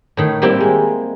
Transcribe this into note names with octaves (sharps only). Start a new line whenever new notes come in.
A2 D#3
G3 A#3 C4 E4 G4
G#3